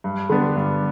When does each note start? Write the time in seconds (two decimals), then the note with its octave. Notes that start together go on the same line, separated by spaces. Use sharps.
0.04 G2
0.29 D3 G3 B3 D4
0.56 G2